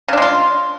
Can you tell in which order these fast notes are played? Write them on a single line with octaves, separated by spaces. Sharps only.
C#3 D4 G#3 F4